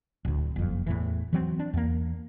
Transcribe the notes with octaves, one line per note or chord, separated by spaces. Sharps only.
D1 D2
F#1 F2
E2 A2 E3
E3 F#3 C4
D4
E2 A#3